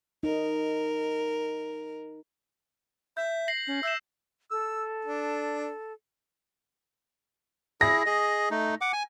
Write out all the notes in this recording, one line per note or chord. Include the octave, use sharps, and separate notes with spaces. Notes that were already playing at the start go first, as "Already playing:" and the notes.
D#4 A#4
E5 G6
A#6 C7 F#7
C#4
E5 E6 G6 E7
A4 E6
D4
E4 G#4 A#6
G#4 D#5
A3 D#4
F#5 D6
G#5